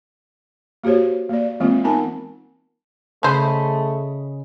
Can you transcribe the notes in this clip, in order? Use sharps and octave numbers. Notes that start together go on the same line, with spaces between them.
A#3 F#4 G4 C5 C#5
A#3 D5
E3 G#3 A#3 C4 F4
B3 D#4 A#4 G#5 A5
C#3 A3 C#4 C5 D#5 B5